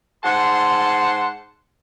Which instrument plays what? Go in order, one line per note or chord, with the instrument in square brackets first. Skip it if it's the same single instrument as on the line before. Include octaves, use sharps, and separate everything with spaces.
[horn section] G#2 F#5 A5 C6